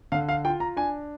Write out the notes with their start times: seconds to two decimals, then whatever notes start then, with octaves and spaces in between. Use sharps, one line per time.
0.12 D3 F5
0.29 F5
0.45 F4 G5
0.60 A#5
0.77 D4 G#5